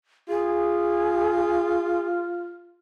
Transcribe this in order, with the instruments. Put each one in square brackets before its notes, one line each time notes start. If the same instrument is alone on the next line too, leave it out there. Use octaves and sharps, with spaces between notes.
[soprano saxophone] F4 [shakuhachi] G#4